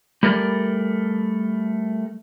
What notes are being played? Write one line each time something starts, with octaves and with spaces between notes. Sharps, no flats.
G3 A3 A#4 D5